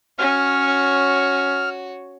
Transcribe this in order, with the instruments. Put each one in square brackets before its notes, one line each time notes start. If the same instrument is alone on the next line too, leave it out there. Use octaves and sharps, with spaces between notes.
[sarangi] C#4 [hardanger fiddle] F#4 C#5 [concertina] F6